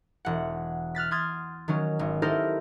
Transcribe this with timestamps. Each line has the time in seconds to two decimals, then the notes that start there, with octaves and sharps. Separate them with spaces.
0.25 E1 F#5
0.95 F6 F#6 A6 B6
1.11 C6 D#6 F6 G#6 A6
1.68 D#3 F#3 C#4
1.99 G#1
2.22 D#4 E4 G4 A4 A#4 C5